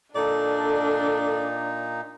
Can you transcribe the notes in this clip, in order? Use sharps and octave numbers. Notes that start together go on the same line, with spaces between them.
A#2 D4 D#4 A4 D5